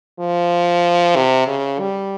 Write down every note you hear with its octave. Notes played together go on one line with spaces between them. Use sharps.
F3
C3
C#3
G3